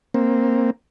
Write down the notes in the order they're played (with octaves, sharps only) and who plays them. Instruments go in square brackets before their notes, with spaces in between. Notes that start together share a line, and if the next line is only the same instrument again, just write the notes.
[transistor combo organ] A#3 C4